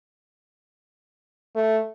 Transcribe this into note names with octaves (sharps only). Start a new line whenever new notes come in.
A3